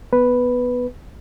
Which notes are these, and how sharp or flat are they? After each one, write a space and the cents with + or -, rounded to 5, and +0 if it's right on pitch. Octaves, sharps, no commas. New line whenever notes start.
B3 +0 B4 +0